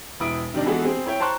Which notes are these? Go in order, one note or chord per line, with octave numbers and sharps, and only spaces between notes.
E1 E4 D#6 D7
C3 D#3 G3 D4 D#4
E3 G#3 B3 F#4 G#4 A4
C4 G#4
E4 C#5 G5
C5 A5 A#5 C6 C#6 F#6